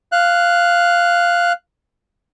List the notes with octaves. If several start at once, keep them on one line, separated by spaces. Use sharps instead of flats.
F5 F#6